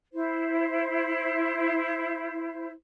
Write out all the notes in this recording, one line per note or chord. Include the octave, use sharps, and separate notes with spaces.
E4 C5